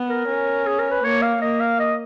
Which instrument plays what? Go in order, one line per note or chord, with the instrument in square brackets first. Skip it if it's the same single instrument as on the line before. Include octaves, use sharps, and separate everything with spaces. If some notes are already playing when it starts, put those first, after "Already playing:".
Already playing: [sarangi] B3
[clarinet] A#4
[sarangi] C#4
[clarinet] G#4
A#4
B4
[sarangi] A#3 [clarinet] C#5
[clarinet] F5
[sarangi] A#3 [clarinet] D#5
[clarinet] F5
D#5